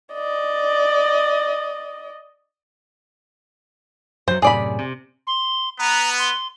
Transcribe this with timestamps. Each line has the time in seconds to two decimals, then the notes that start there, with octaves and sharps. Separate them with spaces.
0.13 D5 D#5
4.28 F#2 F#3 C5
4.42 F#2 A2 C3 G#4 D5 B5
4.79 C3
5.27 C6
5.79 B3 A#5
6.19 C6